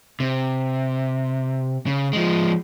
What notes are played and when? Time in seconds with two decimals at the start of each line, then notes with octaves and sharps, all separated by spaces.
0.20 C3
1.87 C#3
2.13 F3 G#3